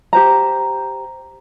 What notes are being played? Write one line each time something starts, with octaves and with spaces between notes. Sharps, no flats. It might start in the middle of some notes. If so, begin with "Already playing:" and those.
G4 C5 A#5